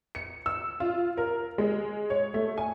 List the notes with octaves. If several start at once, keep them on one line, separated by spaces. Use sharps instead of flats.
C#7
E6
F4
A#4
G#3
C#5
A3
G#5